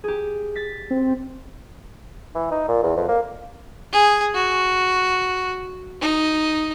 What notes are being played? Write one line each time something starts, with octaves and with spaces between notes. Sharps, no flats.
G4 G#4
A6 B6
C4
E3
D#4
A#2
E2
F2
A#3
G#4
F#4
D#4